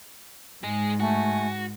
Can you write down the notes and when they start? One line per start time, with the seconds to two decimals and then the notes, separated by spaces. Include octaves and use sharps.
0.64 G#2 G#3 G#4
1.00 A3 F#4 G#5